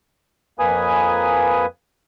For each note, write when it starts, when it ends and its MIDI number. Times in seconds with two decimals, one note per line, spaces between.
0.59 1.66 41
0.59 1.66 58
0.59 1.66 71
0.59 1.66 80
0.59 1.66 87